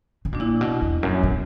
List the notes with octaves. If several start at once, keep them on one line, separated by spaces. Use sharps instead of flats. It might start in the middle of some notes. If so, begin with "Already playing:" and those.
C#3
B2 D4
A#2 E4
B2
E2
F#2
B2